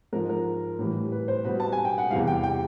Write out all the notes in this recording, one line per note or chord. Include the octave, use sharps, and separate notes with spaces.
G#2 F3 A#4
A#4
A2 E3 G3
B4
C5
B2 G3 B4
A5
G#5
G5
F#5
E2 C3 E3 G3 F5
G5
G5